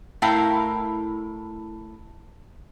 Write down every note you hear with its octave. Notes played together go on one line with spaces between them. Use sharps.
A2 E4 A#4 F5 G5